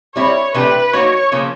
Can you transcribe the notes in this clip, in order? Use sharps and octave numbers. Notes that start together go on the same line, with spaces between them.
D3 G3 C4 E4 C#5
C3 E3 A3 D4 G4 B4
F#3 A#3 D#4 F#4 C#5
C#3 F3 A#3